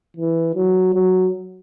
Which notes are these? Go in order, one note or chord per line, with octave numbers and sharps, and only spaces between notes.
E3
F#3
F#3